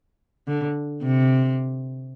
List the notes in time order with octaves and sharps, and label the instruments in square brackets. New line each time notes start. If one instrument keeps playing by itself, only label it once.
[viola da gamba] D3
C3